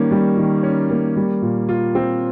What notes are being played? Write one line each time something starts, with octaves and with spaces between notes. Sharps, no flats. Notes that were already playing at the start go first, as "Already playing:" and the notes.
Already playing: D#3 G3 A#3 C#4
G3
D#3
C#4
A#3
G3
A#2
F4
C4